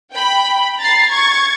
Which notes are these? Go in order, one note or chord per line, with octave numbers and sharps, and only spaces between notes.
G5 B5
A#5 A6 C7
C#6 G#6 A6